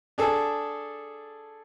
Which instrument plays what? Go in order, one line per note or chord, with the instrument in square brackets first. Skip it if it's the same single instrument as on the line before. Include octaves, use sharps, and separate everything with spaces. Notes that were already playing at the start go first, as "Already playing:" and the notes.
[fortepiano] D4 G#4 A4